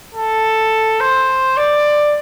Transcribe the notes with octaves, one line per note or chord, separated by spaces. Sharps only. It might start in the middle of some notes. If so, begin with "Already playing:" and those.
A4
C5
D5